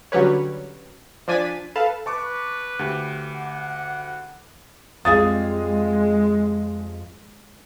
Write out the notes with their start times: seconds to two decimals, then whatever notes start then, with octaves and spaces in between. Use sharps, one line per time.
0.12 D3 F#3 G3 C#4 B4 C#5
1.28 F3 D4 G#5 A6 B6 D#7
1.76 A4 B4 F5 A5
2.06 B4 A5 C#6 D6
2.79 D2 G4
3.31 F#5
5.05 F2 G3 G#3 G#4 F5 D#6 A6